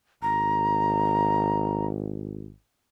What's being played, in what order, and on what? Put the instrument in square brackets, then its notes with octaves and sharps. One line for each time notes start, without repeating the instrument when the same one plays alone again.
[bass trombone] G#1 [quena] A#5